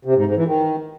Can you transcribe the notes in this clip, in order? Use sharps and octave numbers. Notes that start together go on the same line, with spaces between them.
C3
G#2
G#2
E3
D#3